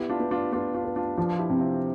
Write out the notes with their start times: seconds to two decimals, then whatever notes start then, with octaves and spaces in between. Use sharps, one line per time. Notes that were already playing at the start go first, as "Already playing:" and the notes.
Already playing: B3 E4 G4
0.10 D4 F4
0.20 B3
0.31 D4 F4
0.53 B3 D4 F4
0.74 D4 F4
0.85 B4
0.96 D4 F4
1.17 F3 D4 F4
1.39 E4 G4
1.49 C3
1.61 C4 E4